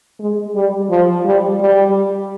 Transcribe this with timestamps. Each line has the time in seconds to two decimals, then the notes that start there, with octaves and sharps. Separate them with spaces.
0.20 G#3
0.55 G3
0.90 F3
1.25 G3
1.60 G3